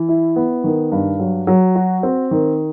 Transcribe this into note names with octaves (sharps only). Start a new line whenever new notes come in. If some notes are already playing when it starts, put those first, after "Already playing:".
Already playing: E3
E4
B3
D#3
G2
F#3
F#3
F#4
C4
D#3